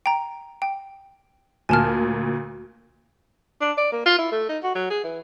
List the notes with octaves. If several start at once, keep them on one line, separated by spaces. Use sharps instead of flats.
G5 A#5
G5
D2 A#2 G#5 A5 F6
D4
D5
A#3
F4
E4
A3
D#4
F#4
F#3
G#4
E3